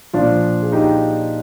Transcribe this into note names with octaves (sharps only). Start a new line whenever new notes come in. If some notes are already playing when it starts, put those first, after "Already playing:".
A#2 F3 D4 F4
G#4
D#4 G4